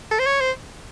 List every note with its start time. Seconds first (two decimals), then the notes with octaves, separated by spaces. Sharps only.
0.11 A4
0.19 C5
0.26 C#5
0.40 C5